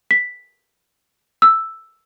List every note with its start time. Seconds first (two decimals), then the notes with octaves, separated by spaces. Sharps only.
0.11 B6
1.42 E6